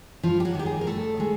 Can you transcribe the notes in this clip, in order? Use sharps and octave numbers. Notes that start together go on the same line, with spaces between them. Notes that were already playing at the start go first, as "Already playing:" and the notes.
G2 F3 F4
G4
F#3 F#4
D#3 G#3 G4
G#3 G#4
A#4
G2 A3 A4
D#3 G#3